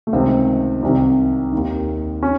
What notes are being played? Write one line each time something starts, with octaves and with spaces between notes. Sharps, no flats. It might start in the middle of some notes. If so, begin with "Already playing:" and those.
A3
C#2 C3 D#3 C4
C2 C3 D#3
D#2 D#3
C#4